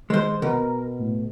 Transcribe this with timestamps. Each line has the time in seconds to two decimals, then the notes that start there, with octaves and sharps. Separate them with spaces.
0.10 D#3 G#3 C5
0.42 B2 A#4
0.99 A2